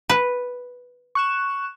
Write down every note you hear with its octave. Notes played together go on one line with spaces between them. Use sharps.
B4
C#6 F#6 E7